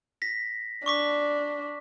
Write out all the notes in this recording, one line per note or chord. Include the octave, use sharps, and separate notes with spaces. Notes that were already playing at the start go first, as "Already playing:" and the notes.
A#6 B6
D4 C#6 D6 B6